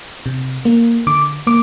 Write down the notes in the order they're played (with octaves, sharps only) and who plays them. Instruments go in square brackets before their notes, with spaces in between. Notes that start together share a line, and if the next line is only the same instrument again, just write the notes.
[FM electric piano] C3
A#3
D3 D6
A#3 D6